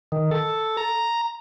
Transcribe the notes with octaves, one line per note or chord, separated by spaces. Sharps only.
D#3
A4
A#5